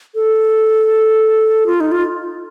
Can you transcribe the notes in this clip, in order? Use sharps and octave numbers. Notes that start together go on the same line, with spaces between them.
A4
F4
D#4
F4